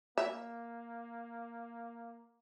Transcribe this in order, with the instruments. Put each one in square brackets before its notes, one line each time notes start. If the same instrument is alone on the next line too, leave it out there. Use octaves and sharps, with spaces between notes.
[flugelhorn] A#3 [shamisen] E5